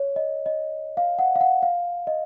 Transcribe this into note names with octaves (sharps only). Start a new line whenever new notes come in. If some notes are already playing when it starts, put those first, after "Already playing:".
Already playing: C#5
D#5
D#5
F5
F#5
F5
F#5
F5
D#5